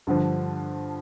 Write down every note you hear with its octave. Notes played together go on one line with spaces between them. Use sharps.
G2 D3 F3